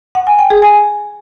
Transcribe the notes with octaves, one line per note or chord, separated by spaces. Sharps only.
F#5
G#5
G5
G#4
G#5